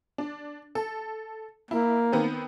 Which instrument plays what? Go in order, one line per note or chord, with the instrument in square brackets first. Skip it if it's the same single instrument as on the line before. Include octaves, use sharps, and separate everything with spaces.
[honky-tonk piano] D4
A4
[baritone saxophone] A#3 [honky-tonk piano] E4
[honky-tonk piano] D#3 B3 C4